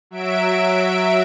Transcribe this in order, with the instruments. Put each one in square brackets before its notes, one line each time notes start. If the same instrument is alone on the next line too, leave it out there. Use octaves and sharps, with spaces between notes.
[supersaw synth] F#3 E5 D7